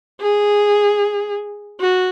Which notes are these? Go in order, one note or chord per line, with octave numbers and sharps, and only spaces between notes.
G#4
F#4